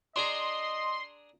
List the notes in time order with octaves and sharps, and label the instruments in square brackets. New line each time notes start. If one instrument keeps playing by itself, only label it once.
[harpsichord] D4 G#4 A#5 [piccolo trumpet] D#5 [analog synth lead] C6